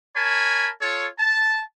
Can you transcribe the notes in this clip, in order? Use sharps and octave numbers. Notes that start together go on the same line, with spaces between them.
A#4 C#5 G#5 A5 B5
F4 A4 C#5
A5